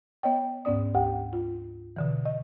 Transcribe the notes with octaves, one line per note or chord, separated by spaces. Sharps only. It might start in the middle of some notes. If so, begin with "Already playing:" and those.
B3 C#5 D#5 G5
D2 G#2 B3 C#4 D5 D#6
D2 G4 G5
F4
B2 D3 E3
D#5